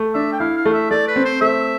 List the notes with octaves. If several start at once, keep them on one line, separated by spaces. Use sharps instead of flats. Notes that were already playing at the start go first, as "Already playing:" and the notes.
Already playing: A3
D4 E5
G5
E4 F5
F5
A3
E5
A3 D5
B4
C4
C5
A3 E5